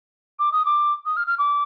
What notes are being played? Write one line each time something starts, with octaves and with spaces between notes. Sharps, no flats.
D6
D#6
D6
D#6
F6
F6
D6